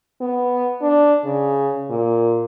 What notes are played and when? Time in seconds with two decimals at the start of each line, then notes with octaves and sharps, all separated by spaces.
0.21 B3
0.82 D4
1.25 C#3
1.90 A#2